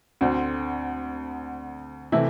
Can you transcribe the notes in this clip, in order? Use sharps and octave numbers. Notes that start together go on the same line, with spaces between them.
D2 D3 C4
C3 E3 A3 E4